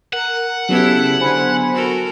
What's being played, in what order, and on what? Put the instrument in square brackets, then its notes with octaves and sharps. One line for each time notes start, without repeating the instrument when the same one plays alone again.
[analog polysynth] A#4 [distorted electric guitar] F#5
[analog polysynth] C#3 [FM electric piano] F#3 B3 G#6 [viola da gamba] E4 G4 A4
[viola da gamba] D3 [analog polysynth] C5 G#5 B5
[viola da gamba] F#4 A4 A#4